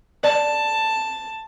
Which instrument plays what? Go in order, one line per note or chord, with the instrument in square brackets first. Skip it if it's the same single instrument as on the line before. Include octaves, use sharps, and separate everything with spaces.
[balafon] D5 [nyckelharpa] A5